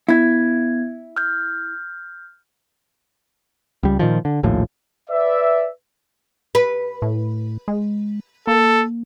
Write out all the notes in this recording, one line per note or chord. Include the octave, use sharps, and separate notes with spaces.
B3 E4 G#6
F6 G6
C#2 G3
A#2 D#3 F3
D3
A#1 D#2 A2 F3
B4 D5 E5
B4
A2
G#3
A#3 A4